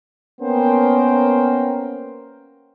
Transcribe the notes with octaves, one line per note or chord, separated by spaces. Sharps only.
A#3 B3 C#4 A#4 C5 G5